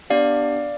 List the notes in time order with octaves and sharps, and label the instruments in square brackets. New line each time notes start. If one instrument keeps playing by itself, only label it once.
[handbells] B3 D4 G4 D5 F5